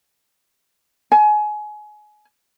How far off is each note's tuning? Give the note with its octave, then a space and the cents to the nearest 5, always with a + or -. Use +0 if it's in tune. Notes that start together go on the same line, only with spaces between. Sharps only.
G#5 +25